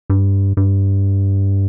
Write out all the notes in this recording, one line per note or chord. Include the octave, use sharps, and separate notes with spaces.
G2
G2